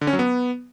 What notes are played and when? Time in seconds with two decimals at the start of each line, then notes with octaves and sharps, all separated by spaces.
0.01 D3
0.07 C#4
0.13 F#3
0.19 B3